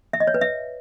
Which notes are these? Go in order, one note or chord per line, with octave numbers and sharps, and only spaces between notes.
E5
D#5
C#5
B4
E5